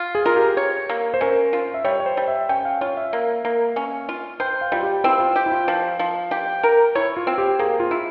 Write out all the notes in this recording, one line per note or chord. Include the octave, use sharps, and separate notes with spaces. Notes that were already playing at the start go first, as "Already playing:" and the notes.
Already playing: F4
G#4
F4 A#4
G4
C#5
A#3
C5
C#4 A#4
F4
E5
G3 C#5
C#5
C5
G3
E5
C#4 G5
F5
F4 C#5
E5
A#3
A#3
C#4
F4
C5 G5
F5
G3 F4
G4
C4 E4
F4
G4
E4
F4
F3
F3
G4
A#4
E4 C#5
F4
C4
G4
A#3 G#4
F4
E4